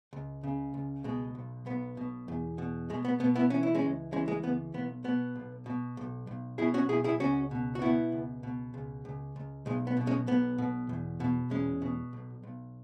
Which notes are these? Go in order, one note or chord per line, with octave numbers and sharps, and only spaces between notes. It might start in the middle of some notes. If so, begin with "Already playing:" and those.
C#2
C#3
C#2
B2 G#3
B1
B1 B3
B2
E2
B2
B2 G#3
B3
B2 B3
B3 E4
E3 C#4
E4
G#3 C#4
C#2
E3 G#3 C#4
G#3
C#2 B3
B1 B3
B2 B3
B1
B2
B1
B1
B2 E4 G#4
C#4 F#4
B1 E4 G#4
E4 G#4
C#2 C#4 F#4
B2
F#4
B2 B3 E4
C#2
B2
C#2
C#2
C#2
B1 G#3
B3
B2
G#3 C#4
B1 B3
B2
E2
B2
E2 G#3 C#4
B2
B1
B1